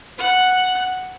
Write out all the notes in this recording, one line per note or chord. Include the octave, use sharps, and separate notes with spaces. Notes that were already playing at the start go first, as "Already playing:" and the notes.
F#5 F#6